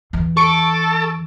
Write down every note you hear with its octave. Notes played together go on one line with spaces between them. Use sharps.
E2 E3
A4 C#6 D7